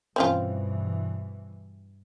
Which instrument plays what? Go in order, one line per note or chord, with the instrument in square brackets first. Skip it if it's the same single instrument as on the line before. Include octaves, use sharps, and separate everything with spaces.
[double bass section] G2 B2 E3 [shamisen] C4 C#4 F4